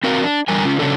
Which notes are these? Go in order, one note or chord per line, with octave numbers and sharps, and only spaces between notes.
C4 F#4 A#4 F5
D4
E2 D3 G3 A#4 G#5
C#3 C#4 F4
C#3 F#3 C#4 D4 A4